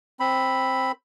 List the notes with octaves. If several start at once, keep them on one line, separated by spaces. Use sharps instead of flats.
C4 B5